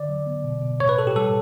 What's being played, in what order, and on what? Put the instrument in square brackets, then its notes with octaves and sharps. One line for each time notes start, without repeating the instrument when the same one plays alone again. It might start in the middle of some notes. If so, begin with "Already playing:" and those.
Already playing: [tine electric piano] D3 D5
F#3
B3
B2
B2
A2 C#5
B4
A2 A4
G4
G3 A4